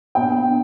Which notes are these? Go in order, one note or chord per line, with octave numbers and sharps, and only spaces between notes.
B2 B3 D4 G5
D4